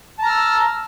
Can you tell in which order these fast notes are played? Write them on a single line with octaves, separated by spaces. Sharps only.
A5 A#5 F6 E6